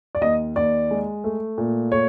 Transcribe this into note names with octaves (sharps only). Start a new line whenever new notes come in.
D5
D#2 D#5
D#2 D5
G#3
A3
A#2
A3 C#5